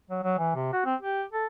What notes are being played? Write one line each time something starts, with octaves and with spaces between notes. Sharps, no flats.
F#3
F#3
E3
C3
F#4
C4
G4
A4